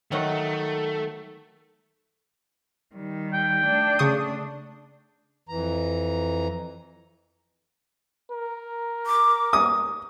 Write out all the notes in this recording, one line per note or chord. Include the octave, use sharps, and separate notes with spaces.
D#3 F#3 A3 D#4
D#3 G3
G5
A3 D4
C#3 C#6 D#6
F2 E3 A#5
A#4
D6
D#6